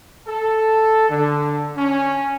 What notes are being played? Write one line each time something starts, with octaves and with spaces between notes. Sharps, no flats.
A4
D3
C#4